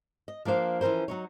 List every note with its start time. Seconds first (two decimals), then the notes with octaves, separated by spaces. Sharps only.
0.28 D#5
0.45 F3 A#3 D4 C5 F5
0.81 E3 F3 C#4 A#4 C5
1.08 F#3 D#4 C#5